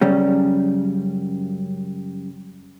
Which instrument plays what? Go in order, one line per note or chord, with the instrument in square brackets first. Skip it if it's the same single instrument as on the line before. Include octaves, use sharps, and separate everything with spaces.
[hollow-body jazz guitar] F#2 C#3 G3 C#4